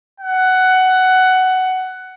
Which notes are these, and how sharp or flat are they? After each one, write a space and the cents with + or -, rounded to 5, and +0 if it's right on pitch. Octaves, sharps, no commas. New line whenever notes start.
F#5 +10